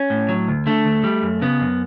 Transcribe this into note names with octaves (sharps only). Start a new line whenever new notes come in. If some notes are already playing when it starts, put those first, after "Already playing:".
Already playing: C#4
A2
F#3
D2
D3 A3
D2
G3
F#2
C#3 B3
F#2